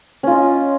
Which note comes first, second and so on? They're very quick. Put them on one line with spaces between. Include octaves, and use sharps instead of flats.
C#4 F4 D#5